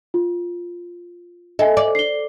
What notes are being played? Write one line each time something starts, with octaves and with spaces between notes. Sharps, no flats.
F4
A4 D#5 E5 G#5
D5
C7 G7